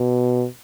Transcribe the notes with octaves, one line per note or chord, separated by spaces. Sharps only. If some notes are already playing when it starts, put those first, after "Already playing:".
Already playing: B2